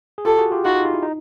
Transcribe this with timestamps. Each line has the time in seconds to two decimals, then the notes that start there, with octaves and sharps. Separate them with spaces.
0.18 G#4
0.25 F4 G4 A4
0.38 F#4 G#4
0.52 F4 G4
0.65 D#4 F4 F#4
0.85 F4
0.94 E4
1.02 D#4